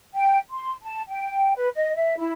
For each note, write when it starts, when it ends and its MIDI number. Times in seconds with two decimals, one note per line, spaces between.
0.14 0.37 79
0.50 0.72 84
0.83 1.02 81
1.07 1.52 79
1.55 1.68 71
1.74 1.93 75
1.95 2.13 76
2.17 2.31 64